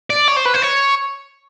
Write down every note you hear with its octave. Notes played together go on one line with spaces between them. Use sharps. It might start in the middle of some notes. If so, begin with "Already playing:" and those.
D5
C#5
C5
B4
C5
C#5